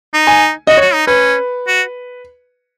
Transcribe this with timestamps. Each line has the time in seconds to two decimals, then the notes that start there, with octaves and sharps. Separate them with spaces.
0.14 D#4
0.27 G#5
0.67 F#4 D#5
0.77 C#5
0.81 F#4
0.94 D#4
1.07 C#4 B4
1.68 F#4